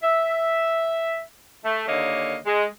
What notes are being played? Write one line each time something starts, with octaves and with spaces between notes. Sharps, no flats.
E5
A3
D#2 D3 A#3 C#5 D#5
G#3